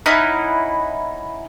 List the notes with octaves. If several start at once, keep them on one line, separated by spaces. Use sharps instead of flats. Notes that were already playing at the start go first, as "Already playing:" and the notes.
C#4 D#4 E4 F#5